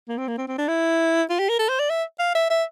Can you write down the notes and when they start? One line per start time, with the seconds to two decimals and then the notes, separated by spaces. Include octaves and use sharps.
0.09 A#3
0.18 C4
0.28 A#3
0.38 C4
0.48 C4
0.58 D4
0.68 E4
1.30 F4
1.39 G4
1.49 A#4
1.59 A4
1.69 C5
1.80 D5
1.90 E5
2.20 F5
2.35 E5
2.50 E5